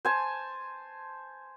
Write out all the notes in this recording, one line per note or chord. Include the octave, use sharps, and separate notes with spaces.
C5 G#5 A5